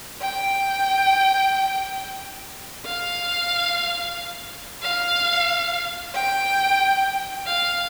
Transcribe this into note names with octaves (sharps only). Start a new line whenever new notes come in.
G5
F5
F5
G5
F5